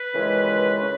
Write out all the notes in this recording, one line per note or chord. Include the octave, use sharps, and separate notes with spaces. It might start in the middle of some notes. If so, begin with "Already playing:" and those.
Already playing: B4
D#2 C#3 E3 G#3
C#3